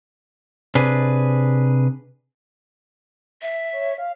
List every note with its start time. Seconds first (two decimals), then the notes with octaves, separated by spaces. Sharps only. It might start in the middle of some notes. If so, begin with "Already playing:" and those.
0.75 C3 D4 G#4 B4
3.42 E5
3.72 C#5
3.98 F5